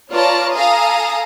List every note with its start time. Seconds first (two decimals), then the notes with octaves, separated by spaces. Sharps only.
0.11 F4 B4 C#5 D5 A5 A#5
0.55 A4 F5 G#5 A#5 D#6